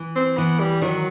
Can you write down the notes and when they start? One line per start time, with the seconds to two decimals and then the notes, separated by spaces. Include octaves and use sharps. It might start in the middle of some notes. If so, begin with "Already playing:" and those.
Already playing: E3
0.16 C4
0.37 E3 B3
0.60 G3
0.82 D#3 F#3